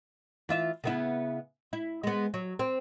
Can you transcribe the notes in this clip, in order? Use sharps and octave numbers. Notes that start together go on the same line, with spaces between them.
E3 F4 E5
C#3 B3 E4
E4
G#3 B3
F#3
C4